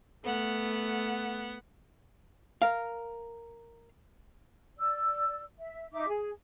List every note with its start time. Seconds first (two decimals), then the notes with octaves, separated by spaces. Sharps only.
0.24 A3 B3 F#5
2.62 A#4 F5
4.78 D5 E6
5.59 E5
5.93 D#4 E5 D6
6.08 G#4